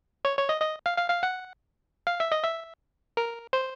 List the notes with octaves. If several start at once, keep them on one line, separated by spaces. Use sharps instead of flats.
C#5
C#5
D#5
D#5
F5
F5
F5
F#5
F5
E5
D#5
E5
A#4
C5